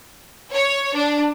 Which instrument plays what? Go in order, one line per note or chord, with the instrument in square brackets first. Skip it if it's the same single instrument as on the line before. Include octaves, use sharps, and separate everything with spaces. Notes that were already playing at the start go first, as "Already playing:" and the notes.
[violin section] C#5
D4